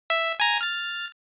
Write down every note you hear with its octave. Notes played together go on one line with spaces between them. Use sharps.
E5
G#5 A#5
F6 A6